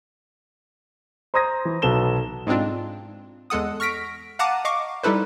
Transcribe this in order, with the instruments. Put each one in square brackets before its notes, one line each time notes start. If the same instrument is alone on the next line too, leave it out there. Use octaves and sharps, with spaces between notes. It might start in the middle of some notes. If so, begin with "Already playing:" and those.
[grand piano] C5 A#5 C6 D#6 G#6 A#6
E3
B1 B3 A4 E7 G7
[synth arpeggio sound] G#2 G#3 C4 D4 F4
E2 G#3 A4 F#5 D#6
C#6 F6 A#6 B6 D7
F5 F#5 A5 A#5 D6 D#7
D#5 F5 C#6 D6
G3 D#4 E4 A4 B4 C5